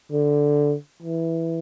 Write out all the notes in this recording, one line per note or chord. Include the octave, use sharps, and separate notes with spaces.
D3
E3